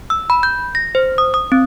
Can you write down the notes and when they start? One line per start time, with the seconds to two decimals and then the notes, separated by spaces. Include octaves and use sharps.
0.10 E6
0.30 B5
0.43 G6
0.75 A#6
0.95 C5
1.18 D#6
1.34 D#6
1.52 C4